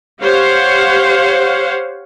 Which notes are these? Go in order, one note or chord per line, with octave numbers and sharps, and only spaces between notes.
G4 C5 C#5 F5 F#5